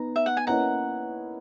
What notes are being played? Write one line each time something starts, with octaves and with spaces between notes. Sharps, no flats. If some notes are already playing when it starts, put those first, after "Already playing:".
Already playing: B3 D#4 A#5
E5
F#5
G#5
A#3 C#4 E4 B4 D#5 F#5 A#5